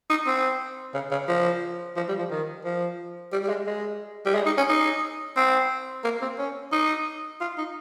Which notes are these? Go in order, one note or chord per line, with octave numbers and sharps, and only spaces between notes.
D#4
C4
C#3
C#3
F3
F3
G3
F3
D#3
F3
G3
G3
G#3
G#3
G3
G#3
D#4
C#4
D#4
C4
A#3
C4
C#4
D#4
F4
D#4